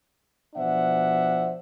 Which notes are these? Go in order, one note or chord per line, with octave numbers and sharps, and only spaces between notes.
B2 F3 D4 C5 E5 F#5